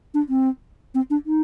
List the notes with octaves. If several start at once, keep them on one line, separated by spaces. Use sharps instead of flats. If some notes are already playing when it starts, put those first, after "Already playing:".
D4
C4
C4
D4
D#4